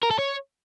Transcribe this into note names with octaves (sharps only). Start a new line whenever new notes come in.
A#4
A4
C#5